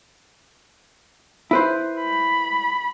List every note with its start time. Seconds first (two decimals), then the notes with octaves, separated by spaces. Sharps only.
1.51 E4 B4 C5
2.01 B5